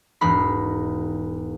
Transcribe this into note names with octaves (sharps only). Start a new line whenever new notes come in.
E1 G#2 D#4 B5 C7